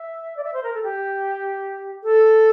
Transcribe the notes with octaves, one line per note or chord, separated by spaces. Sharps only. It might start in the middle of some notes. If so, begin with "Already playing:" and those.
Already playing: E5
D5
E5
C5
A#4
A4
G4
A4